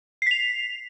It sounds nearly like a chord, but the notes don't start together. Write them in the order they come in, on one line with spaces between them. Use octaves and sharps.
C7 B6 F7